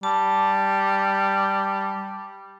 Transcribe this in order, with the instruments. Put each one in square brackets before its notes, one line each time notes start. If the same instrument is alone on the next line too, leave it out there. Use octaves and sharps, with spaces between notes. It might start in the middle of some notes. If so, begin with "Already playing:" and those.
[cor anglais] G3 [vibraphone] A5